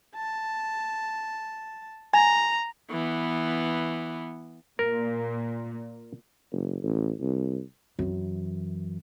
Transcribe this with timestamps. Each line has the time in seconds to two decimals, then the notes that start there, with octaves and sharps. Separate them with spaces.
0.15 A5
2.14 G#5 A#5
2.91 E3 B3
4.79 A#2 A#4
6.52 F#1
6.83 A1
7.20 C2
7.99 F#2 E3